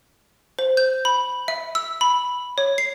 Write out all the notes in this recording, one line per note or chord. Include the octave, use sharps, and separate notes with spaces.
C5
G6
B5
E5
E6
B5
C#5
C7